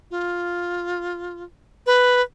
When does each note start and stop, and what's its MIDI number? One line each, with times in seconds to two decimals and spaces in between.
0.11 1.43 65
1.86 2.21 71